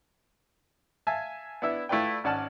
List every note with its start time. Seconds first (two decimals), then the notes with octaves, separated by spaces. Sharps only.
1.07 E5 F5 G#5 A5
1.62 B3 D4 E4 E5
1.89 A3 E4 F4 B4 D5 G5
2.24 G#1 C#4 D5 F#5 A5 F6